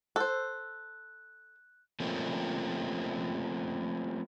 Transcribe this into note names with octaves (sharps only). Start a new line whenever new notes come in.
A4 C5 F#6
F3 A3 A#3 C4 C#4